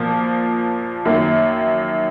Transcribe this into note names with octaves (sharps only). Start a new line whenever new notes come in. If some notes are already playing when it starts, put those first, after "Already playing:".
Already playing: A#2 F3 A#3
F#2 D#3 A#3